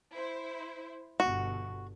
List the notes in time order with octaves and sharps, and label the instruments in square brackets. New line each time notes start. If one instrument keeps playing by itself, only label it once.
[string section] E4 C5
[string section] G1 B2 [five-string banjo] F#4